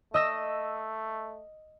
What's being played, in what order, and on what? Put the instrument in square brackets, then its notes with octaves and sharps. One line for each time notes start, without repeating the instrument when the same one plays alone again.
[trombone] A3 [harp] D#5 E6 A#6